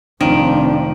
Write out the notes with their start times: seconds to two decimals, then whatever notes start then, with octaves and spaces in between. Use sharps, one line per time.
0.21 F1 D#3 F3 C4 D4